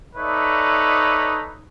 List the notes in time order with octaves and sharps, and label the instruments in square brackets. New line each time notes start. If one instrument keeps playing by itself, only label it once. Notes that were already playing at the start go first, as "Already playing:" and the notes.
[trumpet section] D#4 A4 B4 C#5 D5 E5